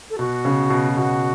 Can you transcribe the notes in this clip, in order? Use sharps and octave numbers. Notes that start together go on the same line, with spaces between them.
A4
B2 F#4
C#3
B2
B2 F#4